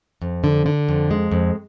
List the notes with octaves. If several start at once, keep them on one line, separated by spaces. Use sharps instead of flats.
F2
D3
D3
F2
G#3
F2